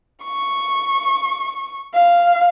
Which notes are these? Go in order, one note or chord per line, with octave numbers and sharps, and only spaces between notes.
C#6
F5